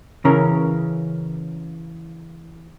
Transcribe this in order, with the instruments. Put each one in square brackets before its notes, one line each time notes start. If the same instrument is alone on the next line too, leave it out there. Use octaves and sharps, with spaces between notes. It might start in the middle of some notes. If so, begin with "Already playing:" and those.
[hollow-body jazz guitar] C#3 E3 C#4 A#4